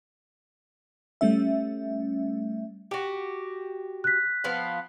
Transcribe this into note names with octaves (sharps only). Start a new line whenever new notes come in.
G3 A3 C#4 E5
F#4 G4
F#6 B6
F3 B3 F5